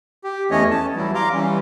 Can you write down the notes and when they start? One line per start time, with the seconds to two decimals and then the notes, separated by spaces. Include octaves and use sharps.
0.24 G4
0.51 E2 E3 A3 C#4 C#5 D#5
0.71 A5
0.96 E3 F#3 G3 E4
1.15 F5 A#5 C6 D6
1.34 E3 G3 C#4